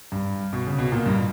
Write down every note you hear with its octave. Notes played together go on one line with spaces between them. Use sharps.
G2
B2
C#3
B2
A#2
G2